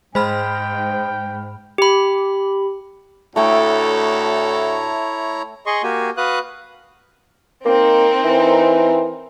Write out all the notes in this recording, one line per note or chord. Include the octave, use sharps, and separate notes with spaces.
G#2 G#3 C5 G5 B5 F6
G4 B5
D2 A2 A3 E4 A4 C#5 G5 A#5
G#4 D#5 C6 C#6
A#3 F#4 G4 G#5
F#4 B4 F5 D#6 F#6
A#3 C4 D#4 A#4
E3